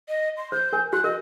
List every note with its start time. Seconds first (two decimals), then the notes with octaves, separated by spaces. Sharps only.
0.08 D#5
0.37 C6
0.52 C5 G6
0.73 A#4 G#5
0.93 F#4 F#6
1.04 A#4 D#5